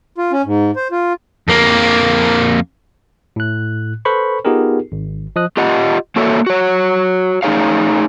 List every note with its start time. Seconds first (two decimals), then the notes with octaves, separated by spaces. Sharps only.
0.18 F4
0.32 C#4
0.45 G#2
0.76 C5
0.92 F4
1.48 F2 A#3
3.36 A2 F#6
4.05 A4 B4 C5 B5 C#6
4.45 B3 D#4 F4 G4 G#4 A#4
4.92 G#1
5.36 F3 D#5 D#6 F#6
5.57 F4 G4 D#5 F#5
6.16 A#3 F#4 A4 C#5 E5
6.47 F#4 C#5
7.43 A3 C#4 D#4 G#4 C#5 F5